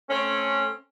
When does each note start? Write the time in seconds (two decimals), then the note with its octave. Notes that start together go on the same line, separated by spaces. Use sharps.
0.10 A3 C4 C#4